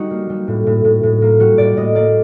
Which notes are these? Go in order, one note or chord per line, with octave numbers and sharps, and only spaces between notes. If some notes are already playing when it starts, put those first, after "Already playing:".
Already playing: G3 D#4 F#4
A#3
G3
A2
A2
A2
A2
A#3
G3 F#4
A2 D5
A2 D#5
A#3 D5